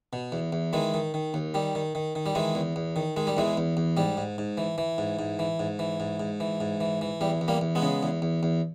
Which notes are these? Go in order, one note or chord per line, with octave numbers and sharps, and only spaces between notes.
B2
E2
E2
D#3 E3 G#3
D#3
D#3
D#2
D#3 G3
D#3
D#3
D#3
G3
D#3 E3 G#3
E2
E2
D#3
D#3 G#3
G3
E2 E3 G#3
E2
E2
G#2 G3
G#2
G#2
E3
E3
G#2
G#2
E3
G#2
E3
G#2
G#2
E3
G#2
E3
E3
E2 G3
E2
G3 A#3
E2
G#3 B3
C#3
E2
E2
E2